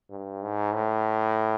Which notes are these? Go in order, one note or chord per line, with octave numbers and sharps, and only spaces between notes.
G2
G#2
A2